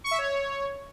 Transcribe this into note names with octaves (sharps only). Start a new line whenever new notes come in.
C#6
E5
C#5